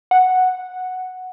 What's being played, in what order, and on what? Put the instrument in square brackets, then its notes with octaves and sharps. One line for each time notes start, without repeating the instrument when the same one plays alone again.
[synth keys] F#5